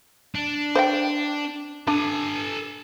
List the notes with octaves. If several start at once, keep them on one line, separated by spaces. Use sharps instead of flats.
D4
C5 F#5 G5
D4 A4 G#5